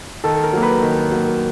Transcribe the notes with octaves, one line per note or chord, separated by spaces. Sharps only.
D#3 A4 A5
A#4 A#5
F#3 A#3
B4 B5
D#3
F#3 A#3